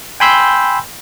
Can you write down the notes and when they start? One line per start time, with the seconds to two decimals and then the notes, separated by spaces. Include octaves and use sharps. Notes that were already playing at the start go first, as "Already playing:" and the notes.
0.20 G5 G#5 B5 C6 E6 G6